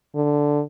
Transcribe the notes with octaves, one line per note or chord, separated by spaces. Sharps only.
D3